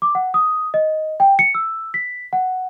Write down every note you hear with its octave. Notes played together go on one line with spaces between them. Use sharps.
D6
F#5
D#6
D#5
G5
C#7
E6
B6
F#5